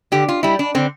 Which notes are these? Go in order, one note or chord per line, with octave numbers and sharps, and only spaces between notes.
D3 G4
F4
G3 E4
D4
D3 C4